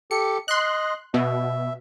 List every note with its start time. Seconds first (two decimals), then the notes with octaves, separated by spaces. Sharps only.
0.11 G4 A4 C#7
0.48 D#5 C6 F#6
1.14 B2 E5